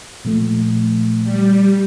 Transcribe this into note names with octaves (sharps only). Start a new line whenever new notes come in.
A#2 F3 A3
G3